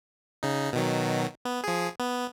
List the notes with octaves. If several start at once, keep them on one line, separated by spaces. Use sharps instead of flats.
C#3 D#4
B2 D#3 F#3
B3
F3 G#4
B3